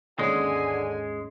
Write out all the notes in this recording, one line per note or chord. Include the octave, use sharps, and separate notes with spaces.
D#2 G#2 D3 G#3 C#4 G#5